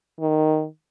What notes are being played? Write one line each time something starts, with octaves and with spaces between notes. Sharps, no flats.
D#3